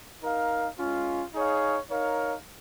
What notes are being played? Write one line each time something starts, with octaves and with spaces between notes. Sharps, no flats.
D#4 A#4 F5
G#3 C#4 F4
D#4 G#4 C#5 F5
D#4 A#4 C#5 F5